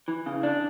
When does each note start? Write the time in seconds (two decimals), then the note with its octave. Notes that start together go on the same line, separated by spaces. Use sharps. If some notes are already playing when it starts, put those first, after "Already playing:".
0.08 E3
0.26 C#3
0.43 D4